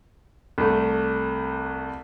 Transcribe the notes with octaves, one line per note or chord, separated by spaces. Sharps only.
C2 A3